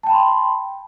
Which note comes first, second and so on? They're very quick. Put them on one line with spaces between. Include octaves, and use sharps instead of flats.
A5 G5 B5 C6